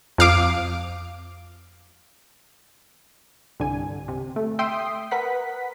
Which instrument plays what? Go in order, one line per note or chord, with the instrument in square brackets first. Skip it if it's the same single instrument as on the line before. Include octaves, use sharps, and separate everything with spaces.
[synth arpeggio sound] F2 F5 D6
C2 G2 D3 G#5
C3
A3
E5 G5 C6 D#6
A#4 B4 F#5 B6